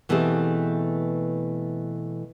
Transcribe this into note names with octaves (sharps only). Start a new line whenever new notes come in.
B2 E3 A3 C4 G4 G#4